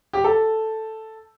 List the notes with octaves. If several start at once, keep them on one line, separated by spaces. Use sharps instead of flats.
G4
A4